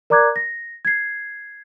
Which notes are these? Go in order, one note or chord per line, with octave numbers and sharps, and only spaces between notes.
A#4 D5 A#5 D6 F#6 G#6
A#6
G#6 C7